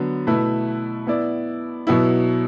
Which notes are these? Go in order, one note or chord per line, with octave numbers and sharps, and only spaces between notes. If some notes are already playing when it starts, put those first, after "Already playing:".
Already playing: D3 F#3 B3
B2 A3 E4 B4
B3 E4 D5
B2 F#3 B3 E4